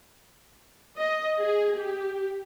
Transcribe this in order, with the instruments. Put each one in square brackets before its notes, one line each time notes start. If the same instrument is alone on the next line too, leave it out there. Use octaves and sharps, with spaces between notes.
[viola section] D#5
G#4
G4